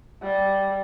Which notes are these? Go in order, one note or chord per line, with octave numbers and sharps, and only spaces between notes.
G3